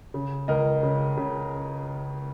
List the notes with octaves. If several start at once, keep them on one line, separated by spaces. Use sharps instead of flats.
C#3
C#2 A#4 D#5
C#3
C#3